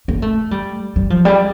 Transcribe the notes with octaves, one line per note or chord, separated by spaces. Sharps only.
A#3
A3
G3
G3
F3
G3